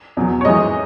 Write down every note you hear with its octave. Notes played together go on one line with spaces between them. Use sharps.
E2 B2 F#3
C#5
G#2 E3 G#3 D#5